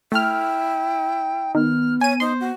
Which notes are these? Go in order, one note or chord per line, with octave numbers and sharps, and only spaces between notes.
A3 E4 G5 F6
D#3 B3 F6
C#5 G#5 D#7
D#4 C5 C6
F#4